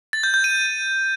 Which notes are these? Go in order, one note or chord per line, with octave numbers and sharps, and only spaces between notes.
A6
G6
G6
D#7